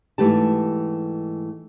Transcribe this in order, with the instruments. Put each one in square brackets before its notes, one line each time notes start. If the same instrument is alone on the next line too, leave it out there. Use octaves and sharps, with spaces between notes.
[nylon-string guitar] G#2 E3 A3 G4 A5